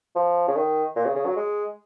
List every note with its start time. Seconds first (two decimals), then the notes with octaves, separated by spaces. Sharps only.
0.16 F3
0.48 C#3
0.56 D#3
0.96 A#2
1.06 C#3
1.16 C#3
1.26 F#3
1.36 G#3